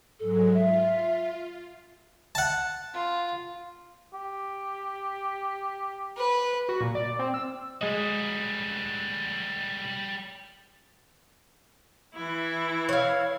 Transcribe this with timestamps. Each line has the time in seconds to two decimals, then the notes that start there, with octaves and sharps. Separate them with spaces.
0.19 G#2 F#3 G#3 A4
0.54 F4 E5
2.35 F#5 A5
2.93 F4
4.13 G4
6.17 B4
6.69 F#4
6.81 A#2
6.95 D5
7.19 C4
7.34 E6
7.81 G3 G#3 F#4 D#5
12.15 E3 E4
12.89 C#5 F5